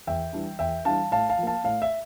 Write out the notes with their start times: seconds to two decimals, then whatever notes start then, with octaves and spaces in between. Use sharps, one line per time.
0.07 E2 E5 G5
0.33 E3 G3 D4
0.59 E2 E5 G5
0.85 E3 G3 D4 F5 A5
1.11 A2 F5 A5
1.29 F5 A5
1.37 F3
1.43 A#3 F5 A5
1.64 A2 F5
1.82 E5